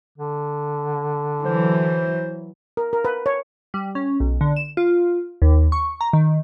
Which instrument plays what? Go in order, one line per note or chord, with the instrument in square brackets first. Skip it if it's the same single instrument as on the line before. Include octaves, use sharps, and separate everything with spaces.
[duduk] D3
[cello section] E3 F#3 [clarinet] C5
[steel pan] A#4
A#4
B4
C#5
[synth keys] G3
C#4
B1
D3
E7
F4
D#2
C#6
A#5
D#3